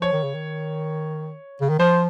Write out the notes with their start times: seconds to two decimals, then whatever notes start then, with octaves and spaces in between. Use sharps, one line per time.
0.01 F3 C#5
0.12 D#3
0.23 C#3
0.34 D#3
1.61 C#3
1.70 D#3
1.79 F3 C5